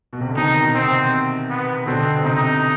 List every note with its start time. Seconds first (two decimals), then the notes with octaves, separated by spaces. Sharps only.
0.13 B2
0.21 C3
0.29 D3
0.37 C3 D#3 D#4
0.62 B2
0.75 C4
0.87 C3
1.50 B3
1.86 B2 D3 C4
2.24 C3 D#4